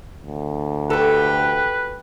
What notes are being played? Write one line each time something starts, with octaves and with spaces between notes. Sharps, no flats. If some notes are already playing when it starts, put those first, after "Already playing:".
D2
F#4 G4 A4 B4 G5